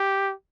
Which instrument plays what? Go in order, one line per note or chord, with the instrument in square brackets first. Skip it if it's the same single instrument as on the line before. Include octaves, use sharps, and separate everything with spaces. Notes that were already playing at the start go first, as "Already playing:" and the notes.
Already playing: [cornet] G4